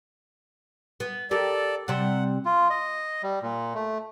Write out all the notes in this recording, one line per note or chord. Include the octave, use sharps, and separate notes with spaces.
B3
G4 A4 A#4 D5
C3 G3 C4 F#5
F4
D#5
G3
A#2
A3